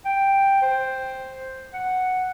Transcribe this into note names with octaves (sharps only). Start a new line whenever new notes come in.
G5
C5
F#5